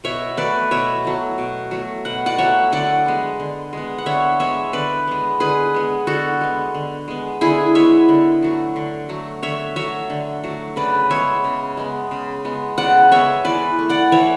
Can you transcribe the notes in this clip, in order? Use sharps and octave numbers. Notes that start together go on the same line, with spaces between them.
B2 C#5 E5
F#3 A3 B4 D5
B2 C#5 E5
F#3 A3
B2
F#3 A3
B2 F#5
D5 F#5
F#3 A3 C#5 E5
D3 D5 F#5
G#3 B3
D3
G#3 B3
F#5
D3 C#5 E5
G#3 B3 C#5 E5
D3 B4 D5
G#3 B3
D3 G#4 B4
G#3 B3
D3 F#4 A4
G#3 B3
D3
G#3 B3
D3 E4 G#4
G#3 B3 C#5 E5
D3
F#3 A3
D3
F#3 A3
D3 C#5 E5
F#3 A3 C#5 E5
D3
F#3 A3
C#3 B4 D5
G#3 B3 C#5 E5
C#3
G#3 B3
C#3
G#3 B3
C#3 D5 F#5
G#3 B3 C#5 E5
E3 B4 D5
A3
D5 F#5
E3 C#5 E5